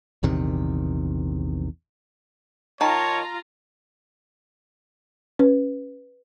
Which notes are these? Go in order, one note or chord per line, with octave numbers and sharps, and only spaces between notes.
A#1 E2 C3 D#3
D#3 F4 C#5 A5 A#5
C#4 B4